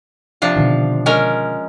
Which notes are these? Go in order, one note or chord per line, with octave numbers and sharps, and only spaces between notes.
C3 F3 D4
B2 D3 D#3
G#3 C#4 A#4